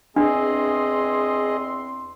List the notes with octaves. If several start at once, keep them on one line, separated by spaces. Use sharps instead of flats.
E2 C4 D4 G#4 D#5 C6